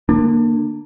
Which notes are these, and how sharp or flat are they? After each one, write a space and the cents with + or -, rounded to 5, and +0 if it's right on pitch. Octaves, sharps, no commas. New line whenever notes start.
D3 +25 A#3 +0 D4 +20